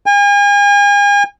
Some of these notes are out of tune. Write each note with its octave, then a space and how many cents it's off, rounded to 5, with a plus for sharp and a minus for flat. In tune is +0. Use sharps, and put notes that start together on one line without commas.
G#5 -40